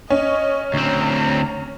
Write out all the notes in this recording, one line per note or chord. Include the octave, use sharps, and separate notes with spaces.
C#4 D#5
D2 C4 A#5